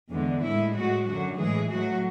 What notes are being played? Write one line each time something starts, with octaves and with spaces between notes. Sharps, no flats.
E2 D3 G#3
A2 G#3 E4
A2 G#3 F#4
F#2 D3 F#3 F#4
A2 E3 G#3 G#4
A2 F#3 A3 F#4